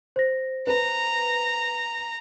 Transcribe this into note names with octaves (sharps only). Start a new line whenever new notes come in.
C5 A#6
B4 A#5